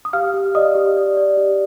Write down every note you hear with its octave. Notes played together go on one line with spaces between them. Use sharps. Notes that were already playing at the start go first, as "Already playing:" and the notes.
D#6
G4 F5 F6
G4
D5 D#5 D#6
G4
D5
D5
G4